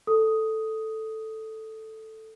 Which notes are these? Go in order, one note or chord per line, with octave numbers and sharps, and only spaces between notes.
A4 D#6